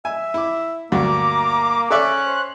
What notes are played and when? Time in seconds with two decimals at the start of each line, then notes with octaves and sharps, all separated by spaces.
0.05 E5 G#5
0.34 E4 D6
0.92 D2 G2 A#3 F#4 A#5 D6
1.90 C#4 A4 D5 E5 F#6
2.24 C5